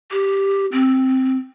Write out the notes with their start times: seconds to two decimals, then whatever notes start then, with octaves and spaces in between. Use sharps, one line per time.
0.11 G4
0.72 C4